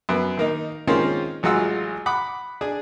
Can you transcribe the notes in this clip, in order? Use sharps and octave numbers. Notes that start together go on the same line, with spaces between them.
F#2 B3
D#3 A#3 D#4
D#3 G#3 A#3 C4 C#4 F4
A1 F#3 G#3 F4 F#5 E6
F#5 B5 D6 D#6
D4 G#4 G#5